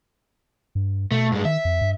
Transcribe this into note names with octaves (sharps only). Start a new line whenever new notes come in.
G2
B2 A3
G2 G#3
D#3 E5
F2
G2